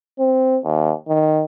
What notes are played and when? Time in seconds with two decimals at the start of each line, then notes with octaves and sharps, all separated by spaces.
0.19 C4
0.64 D#2
1.08 D#3